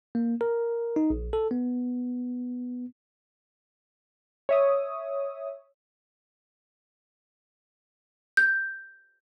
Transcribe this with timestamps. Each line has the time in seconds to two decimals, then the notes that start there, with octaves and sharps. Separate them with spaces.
0.15 A#3
0.41 A#4
0.96 D#4
1.10 A#1
1.33 A4
1.51 B3
4.49 C#5 E5 D#6
8.37 G6